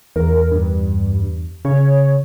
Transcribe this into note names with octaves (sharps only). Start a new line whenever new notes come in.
E2 A#4
G2
C#3 C#5